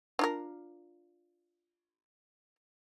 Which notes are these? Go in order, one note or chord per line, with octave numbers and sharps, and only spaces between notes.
D4 F4 A#4